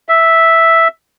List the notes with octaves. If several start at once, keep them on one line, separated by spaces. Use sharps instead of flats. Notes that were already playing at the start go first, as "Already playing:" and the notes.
E5